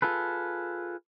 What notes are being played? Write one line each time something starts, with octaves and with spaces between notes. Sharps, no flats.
F4 G#4 A4 B4